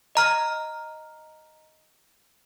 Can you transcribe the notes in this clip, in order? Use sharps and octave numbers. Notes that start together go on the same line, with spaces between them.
D#5 A#5 F6